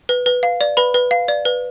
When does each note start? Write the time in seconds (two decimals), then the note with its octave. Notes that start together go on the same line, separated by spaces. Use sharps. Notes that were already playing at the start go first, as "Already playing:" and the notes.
0.09 B4
0.26 B4
0.43 F5
0.61 D5
0.77 B4 B5
0.94 B4
1.11 F5
1.28 D5
1.45 B4